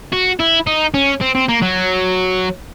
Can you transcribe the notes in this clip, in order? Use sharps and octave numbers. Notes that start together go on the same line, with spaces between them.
F#4
E4
D#4
C#4
C4
C4
A#3
F#3